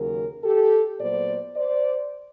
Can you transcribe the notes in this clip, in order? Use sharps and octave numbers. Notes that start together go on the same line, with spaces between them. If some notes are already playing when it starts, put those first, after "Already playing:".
Already playing: D#2 C#3 F#3 G#4 A#4
G4 A4
A#2 F#3 B3 C5 D5
C5 D5